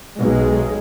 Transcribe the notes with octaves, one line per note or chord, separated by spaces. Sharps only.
B1 G#3